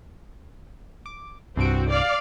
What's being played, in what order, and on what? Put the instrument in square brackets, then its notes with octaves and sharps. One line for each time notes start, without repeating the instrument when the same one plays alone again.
[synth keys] D6
[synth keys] C2 G2 D7 [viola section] C4 F#4
[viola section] D5 F5